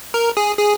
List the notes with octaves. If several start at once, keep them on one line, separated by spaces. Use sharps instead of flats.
A#4
G#4
G#4